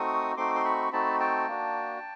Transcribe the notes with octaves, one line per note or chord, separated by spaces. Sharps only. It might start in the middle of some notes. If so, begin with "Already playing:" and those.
Already playing: A3 C4 D#4 F#4 C#6 D#6
A3 C4 D#4 F#4 C6 D6
C6
B5 C#6
A3 C4 D#4 F#4 A5 B5
G5 A5
A#3 D4 F#4